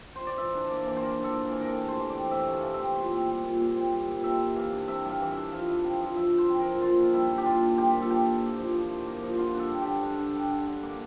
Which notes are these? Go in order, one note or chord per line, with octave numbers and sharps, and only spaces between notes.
C5
D5
E3 E5
D4
A#3 D5
E3
C5
E3 A#4
D4
A4
A#3
A#4
E3
A#4
C3 A4
A3
C5
E3
C4 D5
C3 E5
A3
F5
E3
E5
C4
A#2 C5
C4
G3
A#2
A#2
C4
G3
A#2
C3 E5
G3
E3 F5
D4
C3 E5
G3 F5
E3
E5
D4
F3 F5
E4
C4 F5
F3
F3 E5
E4
C5
C4
A#4
F3
A#2 F4
D4
G3 E4
A#2
G4
A#2 F4
D4
G3 G4
A#2
A4
F3 G4
E4
A#3
F3
F3
E4
A#3
F3
D3 F4
D4
A4
G3
G4
D3
D3
D4
G3
D3
D3
A#3